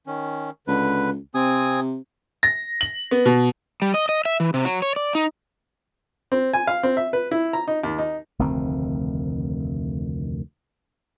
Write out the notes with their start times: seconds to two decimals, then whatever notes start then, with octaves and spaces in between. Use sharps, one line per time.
0.07 D#3 C#4
0.67 C#2 D3 B4
1.35 C3 C4 G#5 D#6
2.43 A#6
2.81 F#7
3.11 B3
3.26 B2
3.82 G3
3.94 D#5
4.09 D#5
4.25 E5
4.40 E3
4.54 C3
4.65 F#3
4.82 C#5
4.96 D5
5.15 D#4
6.32 C4
6.53 G#5
6.67 F5
6.83 C4
6.97 E5
7.13 B4
7.31 E4
7.53 A#5
7.68 D#4
7.84 D#2
7.98 D#4
8.39 F1 D2 D#3 C4